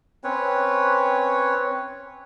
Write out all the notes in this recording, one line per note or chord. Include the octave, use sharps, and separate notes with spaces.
C4 C#4 B4 C#5